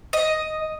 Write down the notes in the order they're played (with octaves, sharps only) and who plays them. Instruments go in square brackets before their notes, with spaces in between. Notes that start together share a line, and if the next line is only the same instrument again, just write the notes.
[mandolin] D#5